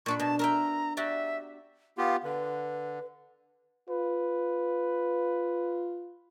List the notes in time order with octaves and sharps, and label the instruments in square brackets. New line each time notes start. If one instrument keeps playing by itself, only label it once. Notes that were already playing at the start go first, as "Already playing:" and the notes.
[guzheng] A#2 D4 B5 [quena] C#6
[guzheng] B2 [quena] A5
[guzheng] A#4 E5 G5 [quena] A#5
[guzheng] F#4 G4 D5 [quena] E5
[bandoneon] B3 F4 G4 [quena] F5
[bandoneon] D3 [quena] B4
[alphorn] F4 [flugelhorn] B4